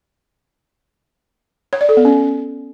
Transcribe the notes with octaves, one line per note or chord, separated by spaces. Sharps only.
C#5
D5
A4
B3
C#4